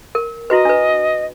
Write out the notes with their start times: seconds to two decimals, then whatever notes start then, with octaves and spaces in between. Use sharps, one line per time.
0.15 A#4
0.50 E4 F#4 B4 D#5
0.65 D4 B4